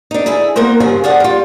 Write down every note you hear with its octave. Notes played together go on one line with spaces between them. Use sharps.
D4 D#4
E4 G#4 A4 G#5
A#3 B3 A#4 C5
G2 C#3 F3 G#4 G#5
F4 G#4 D5 F#5
G3 F4